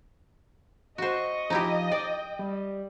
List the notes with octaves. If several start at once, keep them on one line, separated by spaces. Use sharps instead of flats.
F#4 C5 D#5 C#6
F3 D#4 E4 G4
D5 G5
G3